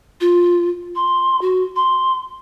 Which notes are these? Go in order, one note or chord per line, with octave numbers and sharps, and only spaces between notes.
F4
C6
F#4
C6